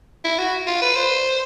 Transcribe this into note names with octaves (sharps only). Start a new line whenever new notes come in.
E4
F#4
F4
B4
C5